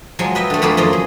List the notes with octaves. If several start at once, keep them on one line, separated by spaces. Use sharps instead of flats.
F3 F#3 G#3 G#5
B4 D#5 E5 G5
D3 A3
F2 D3 A3 A#3 G#4 B5
F#2 F3 D#5 A#5
G#4